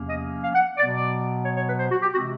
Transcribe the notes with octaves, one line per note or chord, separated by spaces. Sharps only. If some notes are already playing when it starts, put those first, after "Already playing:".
Already playing: E2 C3 F3 A#3 C#4
D#5
F5
F#5
B2 F#3 B3 D5
D5
C#5
C#5
B4
C5
F#4
G4
C3 E3 G#3 C4 F#4